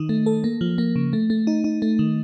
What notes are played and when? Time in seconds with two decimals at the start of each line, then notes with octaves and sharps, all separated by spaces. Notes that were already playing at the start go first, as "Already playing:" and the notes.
Already playing: D#3 D#4
0.09 A3
0.26 A4
0.44 A#3
0.61 F3
0.78 A#3
0.96 C#3
1.13 A3
1.30 A3
1.47 D#4
1.64 D#4
1.82 A3
1.99 D#3